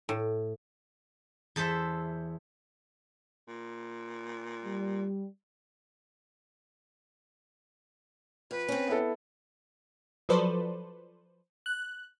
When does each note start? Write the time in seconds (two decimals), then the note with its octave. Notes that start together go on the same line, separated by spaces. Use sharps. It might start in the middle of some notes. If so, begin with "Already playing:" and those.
0.09 A2
1.56 E2 A4 C5 E5
3.48 A#2
4.64 G3
8.51 F2 B4
8.68 C4 C#4
8.87 B3 E4 A4
10.29 F3 F#3 A4 B4 C5 D5
11.66 F#6